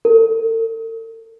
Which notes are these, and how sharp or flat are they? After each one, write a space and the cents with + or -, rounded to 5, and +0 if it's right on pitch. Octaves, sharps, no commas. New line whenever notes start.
A4 +45